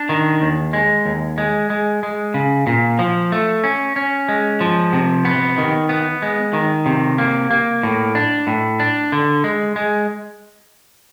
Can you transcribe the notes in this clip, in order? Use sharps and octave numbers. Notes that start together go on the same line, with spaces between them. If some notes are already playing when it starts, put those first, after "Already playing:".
Already playing: D4
D#3
D#2
G#3
D#2
G#3
G#3
G#3
C#3
A#2
F3
A3
C#4
C#4
G#3
F3
C3
B3
D#3
B3
G#3
D#3
C3
A#3
A#3
A2
D4
A2
D4
D3
G#3
G#3